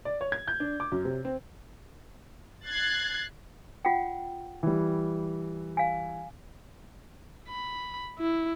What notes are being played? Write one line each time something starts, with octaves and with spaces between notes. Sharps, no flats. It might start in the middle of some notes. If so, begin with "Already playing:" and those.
D5
C#5
G#6
G6
D4
D6
F#2
C3
C4
F#6 G#6 A6 C7
F4 F#5 G5
E3 G3
F5 G#5
B5
E4